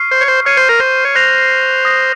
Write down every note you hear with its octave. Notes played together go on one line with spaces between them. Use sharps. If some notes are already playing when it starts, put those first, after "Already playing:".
Already playing: C#6 F6 C7
C5
C#5
C5
C#5 F6 C7 D#7
C5
A#4
C5
C#5
C5 F#6 A#6 F7
D#6 F#6 A#6